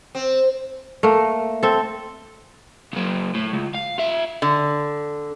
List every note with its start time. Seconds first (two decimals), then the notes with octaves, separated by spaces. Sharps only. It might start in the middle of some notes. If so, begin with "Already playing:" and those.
0.15 C4
1.03 A3 A#3
1.63 C4 A4
2.93 C#3 F#3
3.35 A2
3.54 C#2
3.75 F5
3.98 F4 E5
4.42 D3